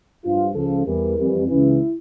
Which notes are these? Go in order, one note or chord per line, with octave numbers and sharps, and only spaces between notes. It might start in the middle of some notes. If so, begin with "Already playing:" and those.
G2 F3 F4
C#2 C#3 F3 A4
E2 E3 G3 A#4
F2 E3 G3
C#2 C#3 E3 E4